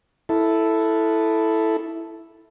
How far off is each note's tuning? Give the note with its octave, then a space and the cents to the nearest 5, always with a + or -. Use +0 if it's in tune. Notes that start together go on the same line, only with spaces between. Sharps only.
E4 +0 A4 +0